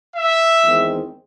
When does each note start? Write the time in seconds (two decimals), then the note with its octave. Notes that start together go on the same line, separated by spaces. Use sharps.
0.15 E5
0.63 E2 D#3 G#3 C4